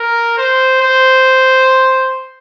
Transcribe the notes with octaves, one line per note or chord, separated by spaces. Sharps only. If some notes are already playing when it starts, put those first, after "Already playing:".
Already playing: A#4
C5
C5